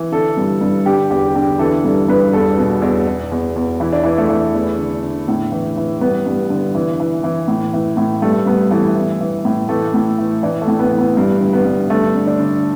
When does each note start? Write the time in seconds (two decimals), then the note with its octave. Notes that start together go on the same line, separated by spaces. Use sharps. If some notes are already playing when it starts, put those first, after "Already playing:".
Already playing: E3
0.12 D3 A4
0.37 G2
0.61 G2
0.86 D3 G4
1.10 E2 G4
1.35 D3 G4
1.59 E3 A4
1.84 G2 A4
2.08 G2 B4
2.33 E2 A4
2.58 B2
2.82 E2
3.07 E2
3.31 E2
3.56 E2
3.80 E3 E4
3.92 D4
4.03 E3 E4
4.18 A3
4.29 E3
4.54 E2
4.78 D3
5.03 D3
5.28 A2
5.52 E3
5.77 E3
6.01 G2 B3
6.26 G2
6.50 D3
6.75 E3
7.00 E3
7.24 E3
7.48 A2
7.73 E3
7.97 A2
8.22 G2 A3
8.46 G2 B3
8.71 E3 A3
8.95 E3
9.20 E3
9.45 A2
9.69 E3 A3
9.94 A2
10.18 E3
10.43 E3 D4
10.61 A3
10.68 A2
10.79 B3
10.91 E3
10.98 B3
11.17 G2
11.41 D3
11.53 B3
11.65 G2
11.90 D3 A3
12.14 D3
12.27 D4
12.40 D3